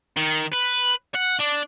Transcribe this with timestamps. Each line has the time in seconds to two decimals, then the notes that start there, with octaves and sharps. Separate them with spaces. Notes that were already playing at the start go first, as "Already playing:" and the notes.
0.17 D#3
0.53 B4
1.15 F#5
1.40 D4